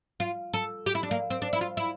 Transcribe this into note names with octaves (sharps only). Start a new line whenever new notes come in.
F4
A4
G4
E4
D4
A#3
C4
D4
E4
F4
E4